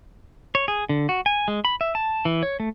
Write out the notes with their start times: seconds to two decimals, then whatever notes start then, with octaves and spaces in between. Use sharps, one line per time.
0.55 C#5
0.68 G#4
0.89 D3
1.09 F#4
1.26 G#5
1.48 G#3
1.65 B5
1.81 E5
1.95 A5
2.25 E3
2.43 C#5
2.60 A3